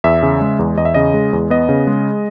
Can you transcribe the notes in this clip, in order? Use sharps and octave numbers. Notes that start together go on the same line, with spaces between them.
E2 E5
C#3
G#3
E2
E2 D#5
E5
C#3 D#5
G#3
E2
B3 D#5
C#3
G#3